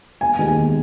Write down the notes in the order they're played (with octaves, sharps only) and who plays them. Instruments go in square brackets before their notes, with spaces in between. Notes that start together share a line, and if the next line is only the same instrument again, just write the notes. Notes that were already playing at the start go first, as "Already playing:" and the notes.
[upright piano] E1 G#5
D#2 D#3 G#3
E1